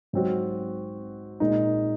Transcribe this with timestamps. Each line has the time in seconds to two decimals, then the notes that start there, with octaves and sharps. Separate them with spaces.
0.13 G#2 F#3 C4 F#4
1.40 A#2 G#3 D#4